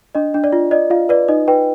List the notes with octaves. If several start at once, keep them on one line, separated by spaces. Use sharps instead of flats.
D4 D#5
D4
D5
F4
D5 D#5
F4 F5
B4 D5
D#4 D#5
B4 G5